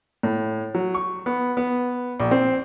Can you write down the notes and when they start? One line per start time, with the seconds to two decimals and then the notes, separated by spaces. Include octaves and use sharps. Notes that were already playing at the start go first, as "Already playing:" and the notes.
0.23 A2
0.75 F#3
0.95 C#6
1.26 B3
1.57 B3
2.20 A#1
2.31 C4